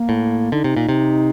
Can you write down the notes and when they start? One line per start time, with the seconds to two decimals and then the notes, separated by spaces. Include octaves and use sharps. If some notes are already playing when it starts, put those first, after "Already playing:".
Already playing: A#3
0.09 A2
0.52 D3 D#4
0.64 C3
0.76 A#2
0.89 C3